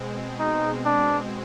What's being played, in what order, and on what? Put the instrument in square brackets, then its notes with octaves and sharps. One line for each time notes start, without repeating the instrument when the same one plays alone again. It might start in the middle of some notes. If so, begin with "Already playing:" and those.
Already playing: [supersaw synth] B2 G#3 C4
[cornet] D#4
D4